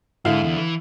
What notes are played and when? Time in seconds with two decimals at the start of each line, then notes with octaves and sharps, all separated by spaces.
0.25 G#2 D3 E4 F5
0.44 E2
0.57 E3